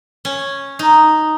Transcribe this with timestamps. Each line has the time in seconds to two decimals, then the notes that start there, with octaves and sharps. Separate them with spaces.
0.25 C#4
0.79 D#4